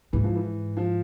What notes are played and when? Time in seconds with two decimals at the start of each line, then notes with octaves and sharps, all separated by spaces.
0.13 G#2 E3
0.24 F3
0.36 E3
0.77 F3